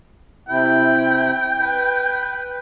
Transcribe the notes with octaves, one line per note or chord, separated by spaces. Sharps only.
C3 E4 G5
B4